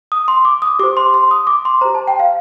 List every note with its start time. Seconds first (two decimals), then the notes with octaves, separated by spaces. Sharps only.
0.12 D#6
0.28 C6
0.45 D6
0.62 D#6
0.79 G4 C5 D6
0.97 C6
1.14 C6
1.31 D#6
1.47 D6
1.65 C6
1.81 G4 C5 A#5
1.95 A5
2.07 G5
2.20 F5